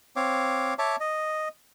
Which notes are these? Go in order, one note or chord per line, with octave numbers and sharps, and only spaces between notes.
C4 C#5 F5 D6
C#5 E5 A5 D6
D#5